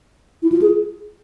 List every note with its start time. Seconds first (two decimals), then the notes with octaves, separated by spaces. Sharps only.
0.42 E4
0.52 F4
0.62 G#4